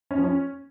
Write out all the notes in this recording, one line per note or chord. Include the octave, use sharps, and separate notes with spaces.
C#4
F3
C#4